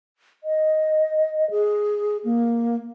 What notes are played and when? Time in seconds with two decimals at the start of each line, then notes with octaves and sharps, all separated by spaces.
0.44 D#5
1.50 G#4
2.25 A#3